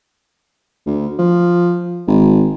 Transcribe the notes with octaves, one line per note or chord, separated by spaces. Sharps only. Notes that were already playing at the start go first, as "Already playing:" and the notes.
D2
F3
G#1